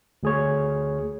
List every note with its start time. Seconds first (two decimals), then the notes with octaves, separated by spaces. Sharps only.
0.23 D2 G#4 C#5